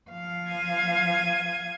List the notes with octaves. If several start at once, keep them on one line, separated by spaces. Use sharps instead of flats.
F3 F5
G#6 D#7